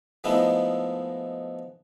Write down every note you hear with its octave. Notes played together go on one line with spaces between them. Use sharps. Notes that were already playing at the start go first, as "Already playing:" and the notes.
F3 G#3 A3 B3 D#4 E4